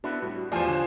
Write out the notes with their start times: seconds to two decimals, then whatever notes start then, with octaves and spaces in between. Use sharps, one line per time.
0.04 B3 D4 E4 F#4
0.22 A2 G3 F#4
0.52 E2 F3 A3 F4 G4 C5 D5 G#5
0.68 D3 C#5 G#5